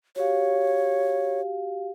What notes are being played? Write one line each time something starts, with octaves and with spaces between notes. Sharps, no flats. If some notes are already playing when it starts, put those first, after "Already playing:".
F#4 G4 C#5 F5